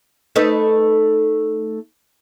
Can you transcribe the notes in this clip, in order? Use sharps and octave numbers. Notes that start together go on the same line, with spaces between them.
A3 D#4 B4